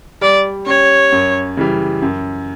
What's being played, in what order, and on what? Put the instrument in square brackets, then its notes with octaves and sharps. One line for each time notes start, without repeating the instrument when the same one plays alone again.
[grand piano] G3 [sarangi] D5
[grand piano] C#4 G4 [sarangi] C#5
[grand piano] F#2
C#3 E3 G3
F#2